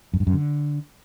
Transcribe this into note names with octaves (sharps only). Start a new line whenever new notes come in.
F#2
G2
F#2
D3